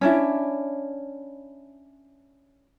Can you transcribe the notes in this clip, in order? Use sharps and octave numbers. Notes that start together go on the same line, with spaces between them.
C#4 D4 E4